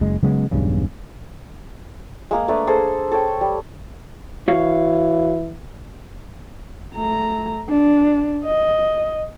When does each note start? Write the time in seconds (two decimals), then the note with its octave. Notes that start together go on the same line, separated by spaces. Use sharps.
0.01 F#1 G#3
0.23 C#3 F#3 G#3 B3
0.51 E1 B1 G2 C#3
2.31 G#3 A#3 G#4
2.48 A3 A#3 D4 B4
2.67 G#4 A4 C5
3.12 A4 C#5 G5
3.41 G3
4.48 E3 F#4 C#5 F5
6.95 A3 A#5
7.69 D4
8.45 D#5